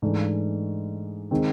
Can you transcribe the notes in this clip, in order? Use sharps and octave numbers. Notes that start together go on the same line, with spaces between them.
G#2 E3 A3 D4
D#3 G#3 C4